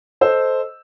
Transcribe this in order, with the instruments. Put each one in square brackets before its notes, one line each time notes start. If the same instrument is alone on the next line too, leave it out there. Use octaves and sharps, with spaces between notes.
[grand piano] A4 C5 D#5 E6